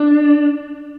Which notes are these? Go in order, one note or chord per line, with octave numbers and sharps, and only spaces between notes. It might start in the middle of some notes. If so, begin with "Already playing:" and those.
Already playing: D4